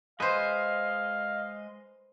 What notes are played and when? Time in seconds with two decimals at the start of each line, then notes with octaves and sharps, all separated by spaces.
0.20 G#3 B4 C5 D#5 F5